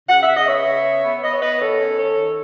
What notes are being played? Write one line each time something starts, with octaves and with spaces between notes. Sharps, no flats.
C#3 F#5
E5
C#3
D#5
B3 C#5 E5
C#3
B3
B3
B3 D#5
C#5
B3 B4 D#5
D#3 A4 C#5
C#4
D#3 A4 C#5
D#3